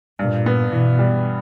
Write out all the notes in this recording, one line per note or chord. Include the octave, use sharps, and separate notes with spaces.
G2 A#2
B3
B2 E3
G3